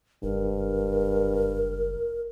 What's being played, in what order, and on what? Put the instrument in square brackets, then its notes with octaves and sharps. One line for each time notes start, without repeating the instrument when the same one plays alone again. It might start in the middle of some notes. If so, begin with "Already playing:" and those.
[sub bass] F#1 [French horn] G2 [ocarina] A#4